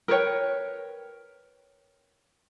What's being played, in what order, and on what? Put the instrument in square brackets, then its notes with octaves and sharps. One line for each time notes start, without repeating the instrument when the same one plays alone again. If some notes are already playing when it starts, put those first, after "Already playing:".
[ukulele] A#4 B4 C#5 G5